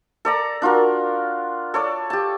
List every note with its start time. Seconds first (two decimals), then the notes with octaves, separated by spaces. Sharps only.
0.25 A4 D5 A#5
0.62 D4 F4 F#4 A#4
1.74 A4 C#5 D5
2.10 G4 A5